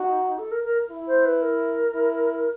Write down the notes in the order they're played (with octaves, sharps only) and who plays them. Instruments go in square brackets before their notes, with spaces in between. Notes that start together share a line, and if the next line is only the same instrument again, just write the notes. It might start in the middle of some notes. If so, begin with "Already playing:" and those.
Already playing: [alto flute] D#4 [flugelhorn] F#4
[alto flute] A4
A#4
A#4
[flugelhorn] E4
[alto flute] C5
B4
A#4
[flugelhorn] E4